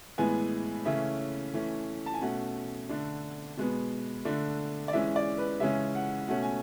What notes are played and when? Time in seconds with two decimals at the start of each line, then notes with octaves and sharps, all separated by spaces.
0.18 A2 E3 G#3 B3 G#5
0.85 C#3 E3 A3 C#4 E5
1.54 E3 A3 C#4
2.06 A5
2.14 G#5
2.21 B2 A3 C#4 F#5
2.89 D3 A3 D4
3.57 B2 G#3 B3
4.25 D3 A3 D4
4.88 D5
4.93 E3 G#3 C#4 E5
5.16 D5
5.38 B4
5.60 C#3 E3 G#3 C#4 E5
5.95 F#5
6.29 B2 A3 C#4 F#5
6.43 G#5